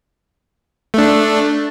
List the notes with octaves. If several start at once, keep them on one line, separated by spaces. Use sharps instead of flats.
A3 D4